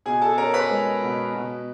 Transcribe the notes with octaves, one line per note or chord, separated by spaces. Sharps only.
B2 G#4 G#5
A4 A5
C#4 A#4 A#5
B4 B5
G#3
B2
B2